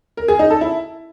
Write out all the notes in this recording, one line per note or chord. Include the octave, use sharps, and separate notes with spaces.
A#4
G#4
D#4
A4
E4